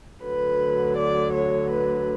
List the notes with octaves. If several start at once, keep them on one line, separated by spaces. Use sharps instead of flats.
D2 D3 F#3 B4
D5
C#5
B4